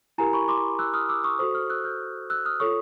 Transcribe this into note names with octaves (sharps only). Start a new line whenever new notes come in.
E4 G4 A#4 G#5 A#5
B5 C#6
C6 D6
E6 F#6
D#6 F6
D6 E6
C#6 D#6
F#4 A4 C5 C#6 D#6
D#6 F6
E6 F#6
F6 G6
E6 F#6
D#6 F6
F4 A4 C#5 C#6 D#6